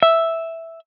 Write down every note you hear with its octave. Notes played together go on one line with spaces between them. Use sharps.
E5